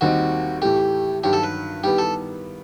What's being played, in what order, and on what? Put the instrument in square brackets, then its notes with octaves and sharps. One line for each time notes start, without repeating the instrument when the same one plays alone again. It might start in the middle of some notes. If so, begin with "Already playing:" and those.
[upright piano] D#2 D#3 G3 C4 D#4 [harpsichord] F#4
[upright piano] A2 E3 A3 [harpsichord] G4
[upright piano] G2 D#3 F#3 [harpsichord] G4
[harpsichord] A4
B4
[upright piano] D#3 G3 B3 E4 B4 [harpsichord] G4
[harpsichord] A4